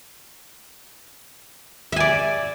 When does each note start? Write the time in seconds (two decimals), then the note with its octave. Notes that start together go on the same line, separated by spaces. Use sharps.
1.92 E5
1.96 G#5
2.00 D5